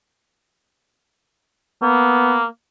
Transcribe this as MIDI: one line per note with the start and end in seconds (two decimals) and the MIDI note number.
1.82 2.45 58
1.82 2.38 59